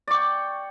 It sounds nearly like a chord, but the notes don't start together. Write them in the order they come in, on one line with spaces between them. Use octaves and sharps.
D5 C#6 G5